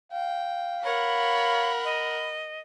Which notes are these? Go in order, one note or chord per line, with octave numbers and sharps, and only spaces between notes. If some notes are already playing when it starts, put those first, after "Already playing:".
F5 G5
A#4 C#5 F#5 B5
D#5